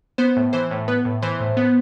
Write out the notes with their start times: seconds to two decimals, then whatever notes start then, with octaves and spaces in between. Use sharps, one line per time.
0.18 B3 C5
0.37 A2
0.53 E3 C5
0.71 A2
0.88 B3 B4
1.05 A2
1.22 E3 C5
1.40 A2
1.57 B3